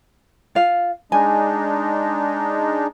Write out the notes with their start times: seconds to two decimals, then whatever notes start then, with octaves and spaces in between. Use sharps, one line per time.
0.55 F4 F5
1.12 G#3 D4 D#4 G#5